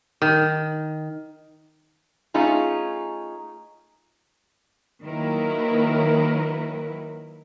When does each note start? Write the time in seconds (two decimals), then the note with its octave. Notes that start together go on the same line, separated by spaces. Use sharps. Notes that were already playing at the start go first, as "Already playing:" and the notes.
0.22 D#3
2.34 A3 C#4 D#4 F4 G#4
5.03 D#3 F#3 A#3 E4 A#4 B4